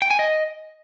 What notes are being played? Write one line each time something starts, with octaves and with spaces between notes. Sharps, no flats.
G5
G#5
D#5